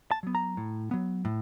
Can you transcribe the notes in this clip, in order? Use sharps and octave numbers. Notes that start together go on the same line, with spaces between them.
A5
F#3 B3
A#5
A2
F#3 B3
A2